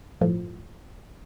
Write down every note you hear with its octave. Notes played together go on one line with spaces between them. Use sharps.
G1 A2 F3